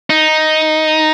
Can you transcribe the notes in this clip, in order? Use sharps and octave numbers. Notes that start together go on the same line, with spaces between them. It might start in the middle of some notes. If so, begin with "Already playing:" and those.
D#4